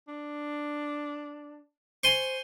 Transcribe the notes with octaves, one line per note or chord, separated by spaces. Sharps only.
D4
C5 G#5 C6 C#6